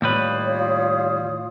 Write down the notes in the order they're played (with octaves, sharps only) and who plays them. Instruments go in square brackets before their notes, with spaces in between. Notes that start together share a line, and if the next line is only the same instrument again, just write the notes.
[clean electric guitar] D#2 G3 B4 [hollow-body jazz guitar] A2 [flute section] F4 C#5 D#6